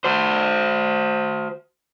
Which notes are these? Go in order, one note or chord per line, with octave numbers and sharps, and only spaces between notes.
F#4 C5